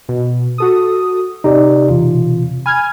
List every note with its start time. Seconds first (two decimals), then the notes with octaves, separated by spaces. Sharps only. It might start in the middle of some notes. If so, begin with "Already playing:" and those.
0.09 B2
0.58 F#4 A4 D#6
1.44 C3 D#4 G4 D5
1.90 B2 E3 F4
2.66 G#5 B5 F6 G#6